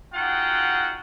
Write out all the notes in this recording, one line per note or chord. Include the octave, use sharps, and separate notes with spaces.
D#4 F4 F#4 G#4 F#5 G5